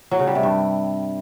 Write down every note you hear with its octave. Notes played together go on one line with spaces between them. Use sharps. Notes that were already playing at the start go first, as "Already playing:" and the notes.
F#3
C#3
G3
C3
G2